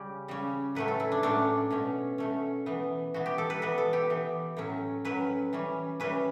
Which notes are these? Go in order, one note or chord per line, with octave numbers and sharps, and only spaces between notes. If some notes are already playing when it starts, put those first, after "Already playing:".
Already playing: C#3 G3 C#4 G4
C#3 G3 C#4
A2 F#3 A3 C#4 B4
A4
E4
D4
A2 F#3 A3 C#4 D4
B2 A3 C#4
B2 A3 C#4
E3 B3
E3 B3 F#4
G4
A4
B4
E3 B3 B4
A4
G4
E3 B3
A2 F#3 C#4
A2 F#3 C#4 B4
E3 G3 C#4
E3 G3 C#4 B4